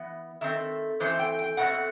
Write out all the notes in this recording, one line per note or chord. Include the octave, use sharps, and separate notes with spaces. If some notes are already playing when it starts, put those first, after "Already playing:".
Already playing: E3 B3
D#3 A3 C4 E5
A2 E3 A3 C4 C5
G5
G5
B2 A3 C4 F#5